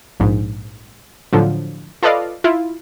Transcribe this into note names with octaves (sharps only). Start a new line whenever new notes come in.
A#1 G#2
A2 D3 F3 F#3
F4 A4 B4 D5 D#5 F5
E4 F4